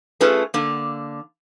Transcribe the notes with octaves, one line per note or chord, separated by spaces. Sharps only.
A3 C#4 F4 G#4 A4 B4
D3 A#3